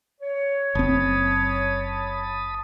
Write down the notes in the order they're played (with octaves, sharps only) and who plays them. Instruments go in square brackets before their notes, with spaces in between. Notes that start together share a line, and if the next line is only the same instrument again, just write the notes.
[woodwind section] C#5
[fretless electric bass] F#1 C4 [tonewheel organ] A5 B5 D#6